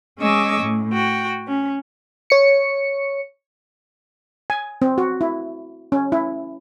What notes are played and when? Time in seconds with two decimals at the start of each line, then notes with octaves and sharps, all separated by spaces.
0.19 G#3 C#4 D#5 C#6 D6 E6
0.63 A2
0.93 F#4 G5
1.47 C#4
2.30 C#5 C#7
4.50 G#5
4.82 C4
4.98 F#4
5.21 E4
5.92 C#4
6.12 E4